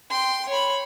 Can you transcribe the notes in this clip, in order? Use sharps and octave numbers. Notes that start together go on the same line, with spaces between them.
G5 C6
C#5 B5